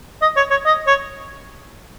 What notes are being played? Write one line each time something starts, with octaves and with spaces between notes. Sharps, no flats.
D#5
C#5
C#5
D#5
C#5